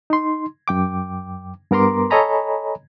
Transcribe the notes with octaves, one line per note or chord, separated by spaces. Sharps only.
D#4 C6
F#2 G5 D6
G2 B3 A#4 A#5 C6 D6
A4 C#5 D#5 G#5 A#5 B5